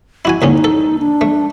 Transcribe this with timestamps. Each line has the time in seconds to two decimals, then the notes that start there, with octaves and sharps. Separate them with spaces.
0.25 E4 F#4 G#5
0.42 D#2 D3 C#4 D#4
0.64 A4
0.99 D4
1.21 A3